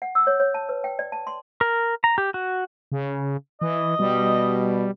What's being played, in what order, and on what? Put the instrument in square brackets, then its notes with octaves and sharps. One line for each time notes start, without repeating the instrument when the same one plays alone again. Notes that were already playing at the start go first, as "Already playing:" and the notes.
[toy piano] F#5
E6
C#5
C#5
A5
B4
G5
D5
A5
C6
[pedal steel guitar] A#4
A#5
G4
F#4
[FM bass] C#3
[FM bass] E3 [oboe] D#5
[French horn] B2 [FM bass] G3